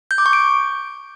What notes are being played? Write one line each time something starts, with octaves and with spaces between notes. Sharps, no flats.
G6
D6
C#6
D7